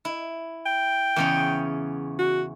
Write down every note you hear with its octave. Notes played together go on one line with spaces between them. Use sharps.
E4
G5
E2 C#3 C#4
F#4